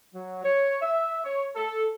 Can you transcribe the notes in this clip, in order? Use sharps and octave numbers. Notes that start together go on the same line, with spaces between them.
F#3
C#5
E5
C#5
A4